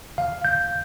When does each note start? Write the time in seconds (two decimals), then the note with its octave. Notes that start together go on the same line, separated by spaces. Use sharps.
0.18 F5
0.45 G6